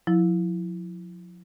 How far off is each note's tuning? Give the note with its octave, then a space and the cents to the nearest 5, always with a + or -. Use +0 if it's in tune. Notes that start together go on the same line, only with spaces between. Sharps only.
F3 +40 E4 +0